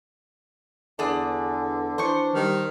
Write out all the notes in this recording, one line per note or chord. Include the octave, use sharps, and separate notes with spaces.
E2 D3 D4 G#4
E3 D4 C5 C#6
D#3 G3